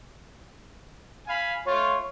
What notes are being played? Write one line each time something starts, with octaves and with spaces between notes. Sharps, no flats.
F5 G#5 B5
A3 F4 C#5